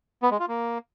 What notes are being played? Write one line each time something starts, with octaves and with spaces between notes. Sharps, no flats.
B3
G#3
F4
A#3